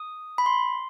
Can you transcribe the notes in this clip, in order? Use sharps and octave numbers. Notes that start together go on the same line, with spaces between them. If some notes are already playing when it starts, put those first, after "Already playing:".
Already playing: D#6
B5
C6